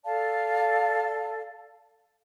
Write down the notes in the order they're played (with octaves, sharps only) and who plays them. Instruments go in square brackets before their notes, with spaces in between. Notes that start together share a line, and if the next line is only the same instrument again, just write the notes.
[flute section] A4 D5 F5 [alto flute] A5